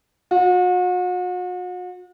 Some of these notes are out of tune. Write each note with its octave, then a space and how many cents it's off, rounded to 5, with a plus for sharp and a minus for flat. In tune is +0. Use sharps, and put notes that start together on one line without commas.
F#4 -40